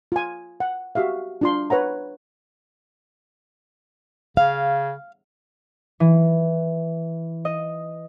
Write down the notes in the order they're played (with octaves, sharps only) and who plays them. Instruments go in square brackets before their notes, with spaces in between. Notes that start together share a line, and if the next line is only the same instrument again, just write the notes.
[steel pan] F4 G#5
F#5
F#4 G4 E5 F5
D4 F4 C6
B4 C#5 F#5 A#5
[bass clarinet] C#3 [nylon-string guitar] F5
[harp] E3
D#5